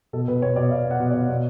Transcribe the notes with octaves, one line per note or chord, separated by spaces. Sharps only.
B2 A4
B2 B4
B2 C#5
B2 D5
B2 F5
B2 F#5
B2
B2 D5
B2